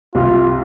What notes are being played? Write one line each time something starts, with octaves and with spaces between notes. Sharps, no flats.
C2 C3 F4